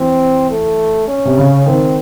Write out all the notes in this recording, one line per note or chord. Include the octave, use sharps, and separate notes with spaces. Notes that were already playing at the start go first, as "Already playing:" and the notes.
Already playing: E3 C4
A3
C#4
C3
C#3
D#3 C4